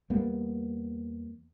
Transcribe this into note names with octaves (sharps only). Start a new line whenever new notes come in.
E2 G3 A#3 B3